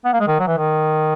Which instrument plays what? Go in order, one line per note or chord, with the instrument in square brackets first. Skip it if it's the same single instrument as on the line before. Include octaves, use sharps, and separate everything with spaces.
[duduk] B3
A#3
G#3
D#3
F#3
E3
D#3